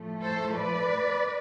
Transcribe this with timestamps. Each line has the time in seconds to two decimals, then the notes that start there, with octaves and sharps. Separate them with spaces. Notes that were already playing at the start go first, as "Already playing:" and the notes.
Already playing: A2 F3 A3
0.23 A4 C5
0.56 B4 D5